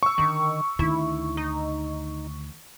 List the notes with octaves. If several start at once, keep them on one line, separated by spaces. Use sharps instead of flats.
C#6 E6
D3 D#3
D2 D#3 E4
D#4